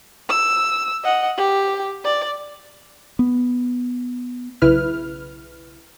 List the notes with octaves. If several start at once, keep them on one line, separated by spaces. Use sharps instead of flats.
E6
D#5 F#5
G4
D5
B3
B1 C#3 E4 B4 F6